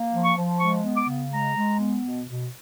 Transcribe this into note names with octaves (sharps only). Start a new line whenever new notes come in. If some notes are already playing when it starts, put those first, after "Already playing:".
Already playing: A#3
F3
C#6
F3
G#3 C#6
B3
D6
C#3
G#3 A#5
G#3
B3
B2
B2